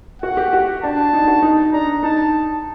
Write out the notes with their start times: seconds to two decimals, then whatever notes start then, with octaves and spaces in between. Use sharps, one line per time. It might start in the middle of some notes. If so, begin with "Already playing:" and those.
0.22 F#4 F#5
0.37 G4
0.53 F#4
0.83 D4 A5
1.13 D#4
1.27 F#4
1.43 D#4
1.73 D4 A#5
2.03 D#4 A5